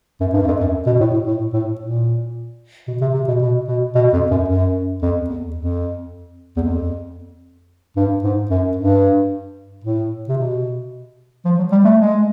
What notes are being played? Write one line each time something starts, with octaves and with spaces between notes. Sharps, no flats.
F#2
G2
F#2
F2
F#2
B2
A2
A2
A2
A2
A#2
B2
C3
C3
B2
B2
B2
B2
F2
F#2
F#2
F2
E2
F2
E2
F2
G2
G#2
F#2
G2
A2
C3
B2
F3
F#3
G3
A3
G#3